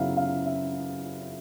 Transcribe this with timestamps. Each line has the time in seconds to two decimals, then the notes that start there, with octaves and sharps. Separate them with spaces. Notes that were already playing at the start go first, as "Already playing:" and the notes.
Already playing: F#2 C#3 F#3 B3 E4 E5 F5
0.17 F5
0.46 E5